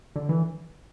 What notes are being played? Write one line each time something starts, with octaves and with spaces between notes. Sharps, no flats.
D3
E3